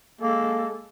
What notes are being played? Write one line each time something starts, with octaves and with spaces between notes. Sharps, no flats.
G#3 A#3 A4